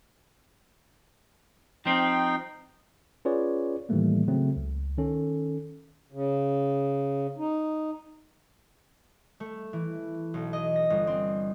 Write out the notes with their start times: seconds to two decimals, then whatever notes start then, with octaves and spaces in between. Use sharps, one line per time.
1.86 F3 C4 D#4 G5
3.25 C#4 F4 G#4 B4 C#5 D5
3.89 A2 D#3 E3 G3 A3 A#3
4.28 C#3 F#3 A3 C4
4.57 C#2
4.98 D#3 C#4 A4
6.12 C#3
7.38 D#4
9.40 A3
9.73 E3
10.34 B1
10.53 D#5
10.76 A#6
10.90 G1
11.07 C4